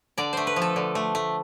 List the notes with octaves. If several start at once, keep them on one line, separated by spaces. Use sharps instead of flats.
D3 D5
A3 C5
B4
F3
A4
D3
A3
A3